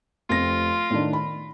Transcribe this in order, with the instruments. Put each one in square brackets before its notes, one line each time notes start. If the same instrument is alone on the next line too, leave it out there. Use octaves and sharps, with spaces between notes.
[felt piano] F1 C4 A#6 [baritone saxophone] F4
[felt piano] A2 D#3 D4
B5